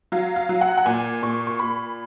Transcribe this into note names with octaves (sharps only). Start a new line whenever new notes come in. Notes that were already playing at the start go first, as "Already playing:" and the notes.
F#3 F5
F5
F#3
F#5
F#5
A#2 G#5
A#2 C#6
C#6
A#2 B5